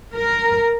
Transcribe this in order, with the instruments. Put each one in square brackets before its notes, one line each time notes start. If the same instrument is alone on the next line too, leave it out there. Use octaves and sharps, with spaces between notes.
[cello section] A#4